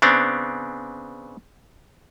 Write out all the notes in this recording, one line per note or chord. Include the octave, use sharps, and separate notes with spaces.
C#3 B3 C4 D4